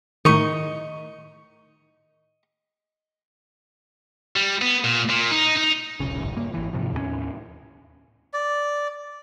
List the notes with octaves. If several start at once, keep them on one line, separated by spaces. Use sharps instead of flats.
A2 D#3 D#5 C#6
G3
B3
A#2
A#2
D#4
D#4
E1 B1 C#3
D#1 G#1 C#2 F#2
G2 A#3
G#1 E3
G#2 C3 F3
D#2 A2 F#3 C#4
D5